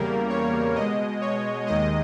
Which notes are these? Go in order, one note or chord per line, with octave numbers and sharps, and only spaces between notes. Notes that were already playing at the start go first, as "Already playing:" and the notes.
Already playing: E2 C#3 G3 A#3 A#4
C#5
B2 G#3 D#5
C#5
D#2 D#3 G#3 D#5